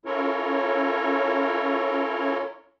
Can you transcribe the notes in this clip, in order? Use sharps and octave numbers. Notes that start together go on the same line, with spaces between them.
C#4 E4 F4 A4 A#4 C#5